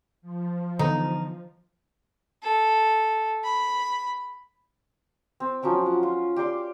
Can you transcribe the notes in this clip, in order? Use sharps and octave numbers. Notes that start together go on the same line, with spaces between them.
F3
D3 E3 B3 D#4
A4
B5
C4
F3 F#3 C#4 G5
F#5
F4
G4 D5 C6 D6